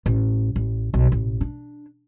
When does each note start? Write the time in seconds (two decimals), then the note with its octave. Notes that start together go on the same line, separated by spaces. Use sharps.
0.06 A1
0.56 A1
0.94 B1
1.12 A1
1.41 D4